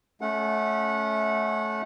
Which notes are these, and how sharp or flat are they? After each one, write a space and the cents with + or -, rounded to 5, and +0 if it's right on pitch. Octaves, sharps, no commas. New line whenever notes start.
A3 -20 C#4 +0 F#5 -20